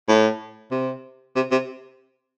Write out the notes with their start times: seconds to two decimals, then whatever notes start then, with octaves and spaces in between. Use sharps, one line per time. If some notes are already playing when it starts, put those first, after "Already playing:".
0.08 A2
0.71 C3
1.36 C3
1.51 C3